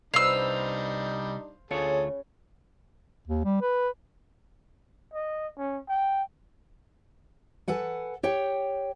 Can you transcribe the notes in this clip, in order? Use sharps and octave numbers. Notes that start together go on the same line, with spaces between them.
C2 G3 D4 D#4 B4 C5 F5 E6
D2 C#3 F4 G#4 A4 C#5
D#2
G3
B4
D#5
C#4
G5
A4 B4 F#5 G#5
G4 C#5 G5